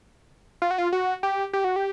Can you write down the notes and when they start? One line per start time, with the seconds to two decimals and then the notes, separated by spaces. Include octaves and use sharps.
0.62 F4
0.71 F#4
0.78 F4
0.92 F#4
1.23 G4
1.53 G4
1.64 F#4
1.76 G4